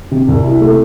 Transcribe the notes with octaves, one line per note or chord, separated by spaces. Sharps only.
C3
C2
E4
A3